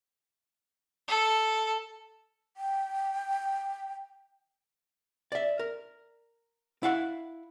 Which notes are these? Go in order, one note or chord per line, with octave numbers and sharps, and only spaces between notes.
A4
G5
D5 E5
A#4
E4 F5 F#5